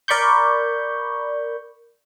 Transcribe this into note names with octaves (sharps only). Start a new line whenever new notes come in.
A#4 D5 B5 C#6 G6